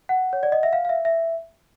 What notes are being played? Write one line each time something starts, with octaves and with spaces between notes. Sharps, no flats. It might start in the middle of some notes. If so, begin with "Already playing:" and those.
F#5
C#5
D5
D#5
E5
F5
F5
E5
E5